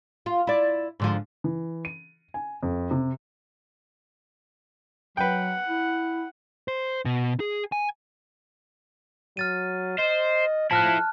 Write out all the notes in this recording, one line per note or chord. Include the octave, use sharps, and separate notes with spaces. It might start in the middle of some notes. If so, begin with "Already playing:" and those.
F4
E4 D5
G#2 D3 F3
E3
D#7
G#5
F2
C3
F#3 B4 F#5 G5
E4
C5
B2
G#4
G#5
F#3 F6 A6 D#7
C5 D#5
F3 E4 A4 A5 F6 F#6